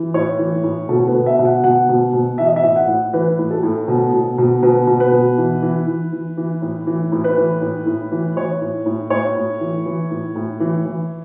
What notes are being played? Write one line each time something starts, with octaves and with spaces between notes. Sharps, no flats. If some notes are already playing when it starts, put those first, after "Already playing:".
Already playing: E3
A2 C#5
E3
A2
B2 A4
B4
B2
E5
B2
F#5
B2 F#5
B2
B2
E3 E5
D#5
E5
A2
F#5
A2
E3 B4
A2
A4
A2
B2
B2
B2
B2 B4
B2
B4
B2
E3
E3
E3
E3
E3
A2
E3
A2
B4
E3
A2
A2
E3
E3 C#5
A2
A2
A2 C#5
A2
E3
E3
A2
A2
E3
E3